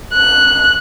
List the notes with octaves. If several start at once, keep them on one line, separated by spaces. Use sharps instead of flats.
F#6